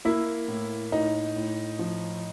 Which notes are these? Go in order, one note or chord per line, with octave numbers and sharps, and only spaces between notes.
A#3 E4
A2
A2 D#4
A2
F3